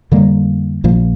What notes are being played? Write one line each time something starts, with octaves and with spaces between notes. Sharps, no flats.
F2 D3 G3 A#3
A#1 A#2 F3 A#3